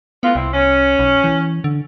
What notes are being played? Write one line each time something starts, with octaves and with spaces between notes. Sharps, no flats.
A2 B3 F4 B4
C2 C4 E4
C#4
B1
E3
D3